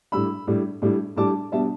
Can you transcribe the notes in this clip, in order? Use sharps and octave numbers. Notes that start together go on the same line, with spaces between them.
A2 G3 D4 B5 E6
A2 G3 D4
A2 G3 D4
A2 G3 D4 A5 D6
B2 G3 D4 E5 A5